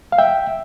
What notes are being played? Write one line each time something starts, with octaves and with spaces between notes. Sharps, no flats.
F5
E5 G5